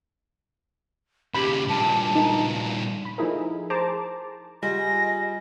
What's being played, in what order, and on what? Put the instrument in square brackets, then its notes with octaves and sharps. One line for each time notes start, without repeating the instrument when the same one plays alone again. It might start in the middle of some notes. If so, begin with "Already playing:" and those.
[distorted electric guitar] D#2 C#3 [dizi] G4 [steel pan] B5
[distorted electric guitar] G2 A#2 [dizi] A5
[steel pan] D#4
[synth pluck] B5
F3 A3 D#4 E4 G#4 A#4
G#4 C5 A5 A#5 D6
[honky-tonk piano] G3 [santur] F4 F#4 G#4 [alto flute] D#5 [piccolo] A#6